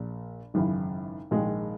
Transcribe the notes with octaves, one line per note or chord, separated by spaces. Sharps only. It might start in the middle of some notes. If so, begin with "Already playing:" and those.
Already playing: A#1 A#2
G#1 F#2 C#3 E3
A#1 G#2 D#3 G#3